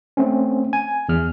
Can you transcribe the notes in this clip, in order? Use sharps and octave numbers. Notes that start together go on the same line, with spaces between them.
A3 C4 C#4
G#5
E2 F6